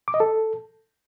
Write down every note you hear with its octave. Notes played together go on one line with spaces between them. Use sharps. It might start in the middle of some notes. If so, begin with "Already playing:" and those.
D6
D#5
A4